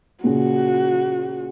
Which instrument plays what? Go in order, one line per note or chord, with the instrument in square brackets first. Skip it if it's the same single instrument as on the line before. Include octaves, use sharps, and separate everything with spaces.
[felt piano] A#2 C#3 [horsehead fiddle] F#4